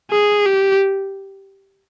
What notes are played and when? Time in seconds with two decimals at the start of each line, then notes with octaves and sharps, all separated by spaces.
0.11 G#4
0.46 G4